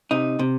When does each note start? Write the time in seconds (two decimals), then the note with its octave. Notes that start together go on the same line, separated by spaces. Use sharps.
0.11 C3 D#4
0.39 C3